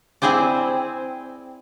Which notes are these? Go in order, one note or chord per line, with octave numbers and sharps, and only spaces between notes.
C4 E4 G#4 C5 D5